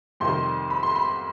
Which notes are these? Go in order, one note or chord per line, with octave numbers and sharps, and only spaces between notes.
F2 C3 D#3 G3 C6
B5
C6
B5